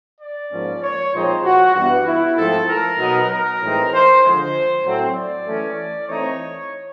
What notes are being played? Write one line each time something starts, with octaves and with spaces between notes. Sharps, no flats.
D5
G#2 F3 A#3 C#4
C#5
A#2 F3 G#3 C4 D#4 C5
F#4
G2 E3 G3 B3 F#4
E4
G#2 F3 A3 C4 A4
A#4
B2 F#3 B3 D#4
A#4
A2 E3 G#3 C4 D#4
C5
D3 F3 G#3 C5
A2 F#3 A3 C4
D5
E3 A3 C#4
E3 A3 C4 D#4 C#5